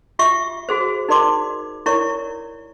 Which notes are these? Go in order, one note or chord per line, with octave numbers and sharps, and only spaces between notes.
F4 G4 E5 C#6
F#4 G#4 C5
D#4 A#4 D5 C6 D6
E4 A#4 C#5 D5 C#6